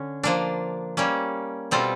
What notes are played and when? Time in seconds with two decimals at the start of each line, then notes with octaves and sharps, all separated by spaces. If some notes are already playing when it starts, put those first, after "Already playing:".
Already playing: D3 C#4
0.23 F3 A#3 D4
0.97 G3 A#3 C#4
1.71 B2 G3 C4 F4 A4